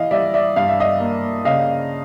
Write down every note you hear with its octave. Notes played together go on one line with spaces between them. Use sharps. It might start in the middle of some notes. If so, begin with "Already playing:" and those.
Already playing: E3 D#5 F5
G3 D5 E5
D5 E5
G2 F5
E5
D#5 F5
A#3
C#3 D#5 F5